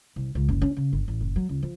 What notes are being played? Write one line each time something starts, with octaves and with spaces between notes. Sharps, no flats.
C2
C#2
F#1
C#4
C#3
G1
A1
F#1
F#3
C#2
F3